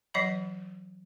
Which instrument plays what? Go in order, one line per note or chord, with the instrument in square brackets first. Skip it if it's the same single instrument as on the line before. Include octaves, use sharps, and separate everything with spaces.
[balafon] E3 F#3 D#5 F#5 B5